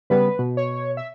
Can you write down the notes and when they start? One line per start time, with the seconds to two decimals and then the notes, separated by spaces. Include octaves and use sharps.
0.10 C#3 G3 B3 B4
0.39 B2
0.57 C#5
0.97 E5